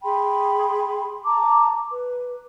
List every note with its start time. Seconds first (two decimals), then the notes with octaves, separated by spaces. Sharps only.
0.02 G#4 G5 B5 C6
1.25 A5 A#5 D6
1.90 B4